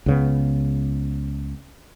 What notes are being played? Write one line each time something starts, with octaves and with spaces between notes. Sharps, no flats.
C#2 C#3 B3